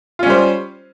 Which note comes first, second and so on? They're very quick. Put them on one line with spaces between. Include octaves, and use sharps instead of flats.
F4 C#4 G3 C5